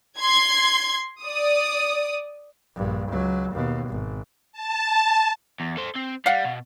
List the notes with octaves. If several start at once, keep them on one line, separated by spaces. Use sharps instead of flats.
C6 G#6
D5 D#6
A#1 G2
C#2 F#3
D#2 B2
G#1
A5
E2
A4 C5
C4
G3 F5 F#5
B2